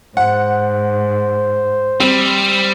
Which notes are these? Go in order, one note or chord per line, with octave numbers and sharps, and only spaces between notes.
G#2 C5 F#5
G3 C4